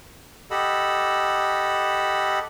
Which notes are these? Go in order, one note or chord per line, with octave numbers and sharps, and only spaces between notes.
G4 A4 D#5 F#5 B5 E6